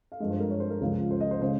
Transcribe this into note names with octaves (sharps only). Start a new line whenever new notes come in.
F5
G2 F3 G#3 D#5
C5
A#4
C#5
C5
A#4
C#2 C#3 F3 G#3
C5
D#5
C5
C#3 G#3 C5